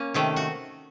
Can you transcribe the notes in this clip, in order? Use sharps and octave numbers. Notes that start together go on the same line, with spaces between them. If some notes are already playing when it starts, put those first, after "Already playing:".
Already playing: A#3 C#4
C3 D#3 A3
F#4